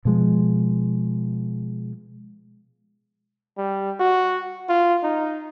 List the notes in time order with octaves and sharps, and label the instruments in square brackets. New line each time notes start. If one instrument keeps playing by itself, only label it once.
[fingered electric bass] B2 F3 G#3
[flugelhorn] G3
F#4
F4
D#4